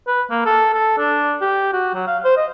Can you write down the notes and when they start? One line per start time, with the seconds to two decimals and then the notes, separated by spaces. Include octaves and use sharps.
0.07 B4
0.31 A#3
0.46 A4
0.74 A4
0.98 D4
1.42 G4
1.73 F#4
1.94 F#3
2.07 F5
2.25 C5
2.37 D#5